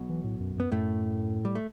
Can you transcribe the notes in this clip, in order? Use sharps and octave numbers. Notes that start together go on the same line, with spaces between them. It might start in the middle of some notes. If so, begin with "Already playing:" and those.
Already playing: B1 B2
E3
A2
F#2
F#2 B3
F#2 A2 A3
G3
A3